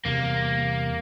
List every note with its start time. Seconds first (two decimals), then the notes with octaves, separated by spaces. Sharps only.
0.05 E2 C3 G3 A#3